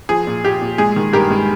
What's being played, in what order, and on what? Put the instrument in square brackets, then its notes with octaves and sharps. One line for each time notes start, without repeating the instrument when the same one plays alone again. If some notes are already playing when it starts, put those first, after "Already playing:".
[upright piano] F3 G#4
A#2
A#2 G4
A#2
G#3 G#4
D#3
G2 G4 A#4
G#3